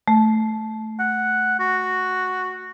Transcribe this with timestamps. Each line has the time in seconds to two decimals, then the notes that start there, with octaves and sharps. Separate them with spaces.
0.08 A3
0.99 F#5
1.60 F#4